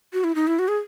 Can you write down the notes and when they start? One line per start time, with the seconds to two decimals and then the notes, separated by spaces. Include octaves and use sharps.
0.13 F#4
0.24 E4
0.35 D#4
0.47 E4
0.59 F#4
0.68 G#4